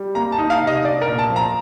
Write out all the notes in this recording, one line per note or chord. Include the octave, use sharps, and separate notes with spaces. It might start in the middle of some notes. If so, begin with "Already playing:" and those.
Already playing: G3
A#3 A#5
A5
D#4
F5
C3
D#5
D4 D5
A#4
A#2
A5
F3
A#5